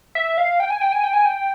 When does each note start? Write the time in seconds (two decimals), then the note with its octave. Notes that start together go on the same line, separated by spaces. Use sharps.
0.15 E5
0.38 F5
0.60 G5
0.70 G#5
0.81 G5
0.92 G#5
1.03 G5
1.13 G#5
1.25 G5